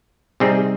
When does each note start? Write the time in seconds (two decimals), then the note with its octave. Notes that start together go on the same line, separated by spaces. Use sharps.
0.40 C3 G3 C4 D#4 G#4